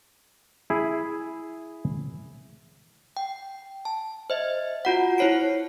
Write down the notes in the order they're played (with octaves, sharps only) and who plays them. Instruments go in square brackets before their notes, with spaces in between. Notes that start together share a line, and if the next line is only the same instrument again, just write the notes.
[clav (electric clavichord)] E4 G#4
[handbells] G5
A5
C5 D#5 E5
F4 F#4 F#5
E4 C5 C#5 C7 D7